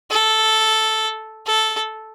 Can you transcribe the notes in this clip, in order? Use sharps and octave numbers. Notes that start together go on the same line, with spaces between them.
A4
A4